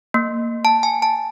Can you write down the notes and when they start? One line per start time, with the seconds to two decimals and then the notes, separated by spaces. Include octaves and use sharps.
0.14 A#3
0.65 A5
0.83 G#5
1.02 A5